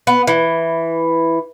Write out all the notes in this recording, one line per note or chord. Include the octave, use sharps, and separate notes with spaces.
B3
E3